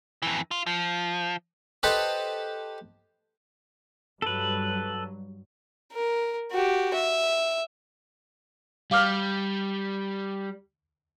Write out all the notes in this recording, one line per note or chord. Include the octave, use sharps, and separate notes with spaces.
F2 E3
F4
F3
G4 A4 B4 C5 D#5 A5
G2 F#3 A4 B4
A#4
F#4 G4
E5
G3 F5 D6 F6